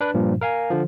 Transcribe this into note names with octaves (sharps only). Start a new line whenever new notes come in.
D4 B4
G2 A#2 F3
A#4 F5 G#5
D3 F3